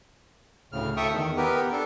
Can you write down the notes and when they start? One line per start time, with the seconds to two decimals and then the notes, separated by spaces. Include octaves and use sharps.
0.72 D2 A2 C#3 F6
0.97 A4 E5 G5 C#6 D#6
1.12 E2 D#3
1.37 B3 G4 A#4 B4
1.72 D4 A4